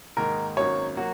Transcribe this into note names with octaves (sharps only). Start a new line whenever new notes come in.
G#2 D#3 A#3 D#4 A#4
G#1 F#2 F#3 A#3 C#5
F#3 A#3 F#4